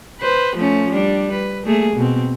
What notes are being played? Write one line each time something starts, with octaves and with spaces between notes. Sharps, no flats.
B4 C5
F3 A3 C#4
G3 D4
B4
A3 A#3 G#4
B2 C4